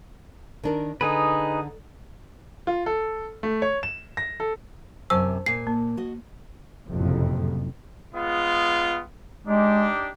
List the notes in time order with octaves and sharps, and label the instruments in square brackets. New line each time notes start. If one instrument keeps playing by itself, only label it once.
[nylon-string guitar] D#3 D4 A#4
[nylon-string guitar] D3 [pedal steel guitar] D#4 G#4 B4
[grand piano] F4
A4
A3
C#5
E7
A#6
A4
[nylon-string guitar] F#2 C3 G#5 [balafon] C5 A5 C#6 [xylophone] E6
[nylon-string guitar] A#2 G#5 [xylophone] C7
[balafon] A#3
[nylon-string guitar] F#4 D#5
[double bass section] F#1 F2 A2 C3
[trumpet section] G#3 B3 F4
[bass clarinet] G#3 [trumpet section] D4 D#4 G4